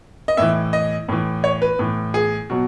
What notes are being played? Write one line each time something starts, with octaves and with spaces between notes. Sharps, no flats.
D#5
A2 E3 E5
D#5
A2 E3
C#5
B4
A2 E3
G#4
B2 F#3